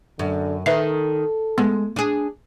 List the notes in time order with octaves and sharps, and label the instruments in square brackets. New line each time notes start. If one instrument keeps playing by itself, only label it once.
[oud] F#2 [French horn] D3
[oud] D#3 [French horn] A4 [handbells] B4 E5 C7
[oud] G#3 [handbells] B3
[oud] D4 G#4